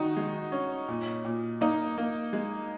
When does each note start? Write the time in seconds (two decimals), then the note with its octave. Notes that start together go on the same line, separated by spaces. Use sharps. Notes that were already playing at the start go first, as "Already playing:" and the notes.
Already playing: D#3 D#4 F#4
0.17 G#3
0.52 C#4
0.88 A#2
1.25 A#2
1.61 A#3 D#4
1.98 A#3
2.33 G#3